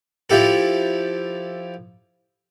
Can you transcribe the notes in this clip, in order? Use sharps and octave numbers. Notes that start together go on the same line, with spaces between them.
F3 E4 G4 A4